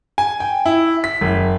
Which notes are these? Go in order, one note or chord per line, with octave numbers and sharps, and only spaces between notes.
G#5
G5
E4
B6
F#1